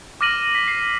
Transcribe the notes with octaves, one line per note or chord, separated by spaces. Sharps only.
D6 F6 A#6 D#7 F#7
B6
C7